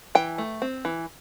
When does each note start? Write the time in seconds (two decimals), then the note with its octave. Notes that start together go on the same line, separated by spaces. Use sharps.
0.15 E3 G5
0.38 A3
0.62 C4
0.85 E3